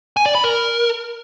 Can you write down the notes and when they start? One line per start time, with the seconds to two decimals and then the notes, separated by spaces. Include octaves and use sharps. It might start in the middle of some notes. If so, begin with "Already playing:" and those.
0.17 G#5
0.26 D5
0.35 B5
0.44 A#4